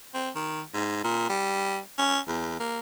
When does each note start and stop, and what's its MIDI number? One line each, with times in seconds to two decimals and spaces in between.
0.14 0.30 60
0.35 0.62 51
0.74 1.02 44
1.04 1.27 46
1.29 1.79 55
1.98 2.19 61
2.28 2.56 40
2.60 2.80 58